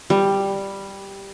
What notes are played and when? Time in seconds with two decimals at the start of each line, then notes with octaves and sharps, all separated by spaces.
0.10 G3